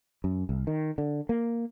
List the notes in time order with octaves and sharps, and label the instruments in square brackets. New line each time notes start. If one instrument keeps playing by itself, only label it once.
[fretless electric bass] F#2
C2
D#3
D3
A#3